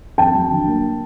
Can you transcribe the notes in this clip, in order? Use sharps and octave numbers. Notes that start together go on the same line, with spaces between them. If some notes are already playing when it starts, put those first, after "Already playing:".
F2 G5 A5
F#3
D3
A#3